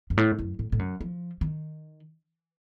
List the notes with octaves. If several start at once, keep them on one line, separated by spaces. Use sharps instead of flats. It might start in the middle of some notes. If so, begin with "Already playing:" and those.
F#2
A2
F#2
A2
A2
F#2
F3
D#3